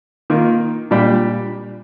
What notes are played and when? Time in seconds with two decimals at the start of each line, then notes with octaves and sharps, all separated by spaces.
0.30 D#3 A#3 F4
0.91 A#2 G3 D4 G4